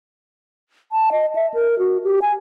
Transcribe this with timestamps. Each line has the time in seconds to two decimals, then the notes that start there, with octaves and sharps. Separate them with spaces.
0.92 A5
1.12 D#5
1.35 E5
1.54 A#4
1.79 F#4
2.04 G4
2.22 G#5